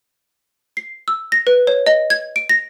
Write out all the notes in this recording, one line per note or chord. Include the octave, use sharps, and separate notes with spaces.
C7
E6
A#6
B4
C#5
D#5
G#6
D7
A#6